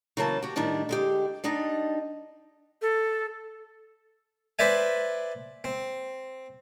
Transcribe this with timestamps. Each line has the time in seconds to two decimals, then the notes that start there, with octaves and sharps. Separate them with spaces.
0.17 C#3 E3 F#3 A#3 E5 A5
0.43 F#4 G4
0.56 A2 D#3 G3 D4 E4
0.89 D3 G#3 G4
1.44 G3 D4 D#4 D#5
2.82 A4
4.59 B4 C5 D5 E5 G#5
5.64 C4